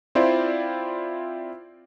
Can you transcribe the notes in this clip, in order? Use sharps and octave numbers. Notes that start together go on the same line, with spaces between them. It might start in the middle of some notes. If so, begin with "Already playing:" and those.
C4 E4 F4 C5 D5